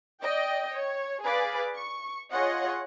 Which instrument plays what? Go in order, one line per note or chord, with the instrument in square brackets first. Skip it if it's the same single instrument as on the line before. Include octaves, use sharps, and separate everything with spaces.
[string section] D5 D#5 G5
C#5
G#4 B4 D5 F5
C#6
F4 G#4 C#5 D#5 F#5